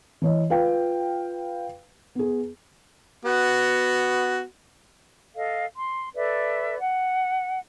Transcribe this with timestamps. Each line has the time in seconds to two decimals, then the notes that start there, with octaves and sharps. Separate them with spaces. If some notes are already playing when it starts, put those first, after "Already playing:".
0.22 E3 C#5 D#5
0.50 F4 B4 F5 G5
2.15 B3 G#4
3.25 B3 F#4
5.36 A4 D#5 F5
5.77 C6
6.15 A4 B4 D5 E5
6.81 F#5